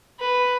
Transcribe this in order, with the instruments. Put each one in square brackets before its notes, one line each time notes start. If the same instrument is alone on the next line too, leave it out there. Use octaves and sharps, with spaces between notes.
[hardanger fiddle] B4